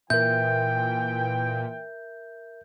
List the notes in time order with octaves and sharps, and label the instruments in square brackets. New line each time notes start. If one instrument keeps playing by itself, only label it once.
[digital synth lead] A#2 [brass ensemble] E3 G5 [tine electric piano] A#4 E5 [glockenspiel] G6